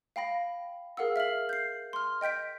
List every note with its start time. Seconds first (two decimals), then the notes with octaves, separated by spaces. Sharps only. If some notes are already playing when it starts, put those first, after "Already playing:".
0.16 F5 G5 B5 A#6
0.97 G#4 A#4 F5 F#5 E6
1.16 E5 F6 C7 F#7
1.49 G6 C7
1.93 C6 F6
2.21 D#5 G5 G6 B6 D7